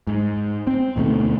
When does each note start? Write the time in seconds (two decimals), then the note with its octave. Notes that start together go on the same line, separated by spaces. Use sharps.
0.07 G#2
0.67 C4
0.96 D2 B2 D#3 A3